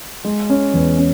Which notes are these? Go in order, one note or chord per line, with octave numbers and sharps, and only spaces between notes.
G#3
C#4
E2
C#4